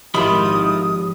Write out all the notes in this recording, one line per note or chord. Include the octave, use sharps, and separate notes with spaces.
G#1 D#3 F3 E4 F4 G4 B5 D#6